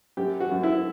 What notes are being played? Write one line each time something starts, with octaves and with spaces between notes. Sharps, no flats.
F#2 G4
F#4
F#2
E4